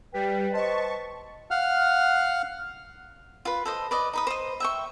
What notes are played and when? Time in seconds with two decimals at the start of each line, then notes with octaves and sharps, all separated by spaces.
0.14 G3 B4 G5
0.53 C5 D#5 A5 C#6
1.51 F5 F#5 F6
3.45 F4 B4
3.65 A4 C5 D#5
3.91 B4 D5 D#5
4.13 D#4 B4 D#6
4.27 C5 D#5
4.60 E5 G5 C#6